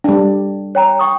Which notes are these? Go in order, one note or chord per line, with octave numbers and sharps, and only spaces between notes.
G3 D4
C#5 G5 A#5
G5 C#6 D#6